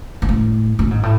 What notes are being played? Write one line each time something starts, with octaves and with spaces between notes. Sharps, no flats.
G#2
A2
A2
G#2
A2